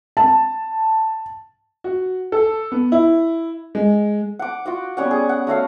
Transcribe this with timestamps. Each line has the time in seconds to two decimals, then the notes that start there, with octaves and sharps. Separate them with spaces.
0.17 A5
1.84 F#4
2.32 A4
2.72 B3
2.92 E4
3.75 G#3
4.39 F#5 D6
4.65 F4 F#4 F#5
4.97 G3 B3 C#4 F#5
5.11 G#4
5.29 F#5
5.47 A3 F#4 C#5 F5